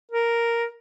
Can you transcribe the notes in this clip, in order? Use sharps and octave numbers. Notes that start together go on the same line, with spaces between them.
A#4